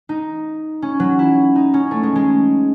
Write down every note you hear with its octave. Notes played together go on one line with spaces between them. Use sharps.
D#4
C#4
F#3
E4
D#4
C#4
A3
G#3
G#3